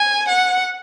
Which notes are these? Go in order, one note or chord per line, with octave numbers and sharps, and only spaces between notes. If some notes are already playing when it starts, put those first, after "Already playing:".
Already playing: G#5
F#5